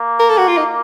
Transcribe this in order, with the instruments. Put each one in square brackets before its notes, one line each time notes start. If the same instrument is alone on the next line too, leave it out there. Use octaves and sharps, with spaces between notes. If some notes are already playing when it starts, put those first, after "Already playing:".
Already playing: [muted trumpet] A#3
[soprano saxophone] A#4
A4
F#4
F4
D#4